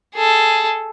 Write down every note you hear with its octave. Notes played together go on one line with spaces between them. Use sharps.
G#4 A4